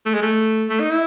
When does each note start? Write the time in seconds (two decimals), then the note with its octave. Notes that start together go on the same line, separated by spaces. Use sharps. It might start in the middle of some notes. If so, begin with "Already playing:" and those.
0.06 A3
0.14 G#3
0.23 A3
0.69 A3
0.80 D#4
0.90 E4